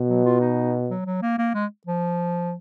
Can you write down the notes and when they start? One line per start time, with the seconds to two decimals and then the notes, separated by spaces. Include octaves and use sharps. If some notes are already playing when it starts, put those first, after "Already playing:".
Already playing: B2
0.09 F#3
0.25 F4
0.41 D#4
0.90 F#3
1.06 F#3
1.22 A#3
1.38 A#3
1.54 G#3
1.87 F3